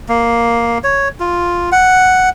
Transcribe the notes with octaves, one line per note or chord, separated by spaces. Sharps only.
A#3
C#5
F4
F#5